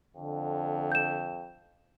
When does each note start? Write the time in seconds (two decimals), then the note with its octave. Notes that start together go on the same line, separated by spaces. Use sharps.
0.16 F2 D3
0.92 G6 E7